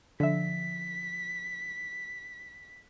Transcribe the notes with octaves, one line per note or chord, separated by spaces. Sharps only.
D3 F3 E5 B6